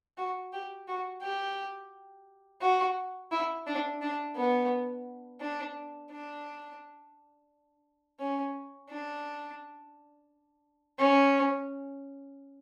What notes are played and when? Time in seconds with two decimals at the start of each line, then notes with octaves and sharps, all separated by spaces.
0.17 F#4
0.53 G4
0.88 F#4
1.22 G4
2.61 F#4
3.31 E4
3.67 D4
4.02 D4
4.36 B3
5.40 D4
6.11 D4
8.20 C#4
8.90 D4
10.99 C#4